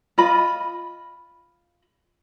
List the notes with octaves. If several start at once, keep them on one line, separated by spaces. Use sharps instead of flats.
F4 D#5 B5